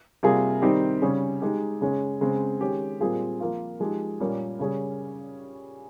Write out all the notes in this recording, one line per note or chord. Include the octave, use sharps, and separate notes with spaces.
C3 G3 A#3 F4 G#4
D#3 G3 C4 D#4 G4
C#3 G3 C#4 G#4
G#3 D#4 G4
C#3 G#3 C#4
C#3 G#3 C4
D#3 G#3 C#4 G4
A#2 G3 C4 F4 G#4
F3 A#3 F4
F3 G#3 D#4 G4
A#2 G3 A#3 C#4 G4
C#3 G3 C#4 G#4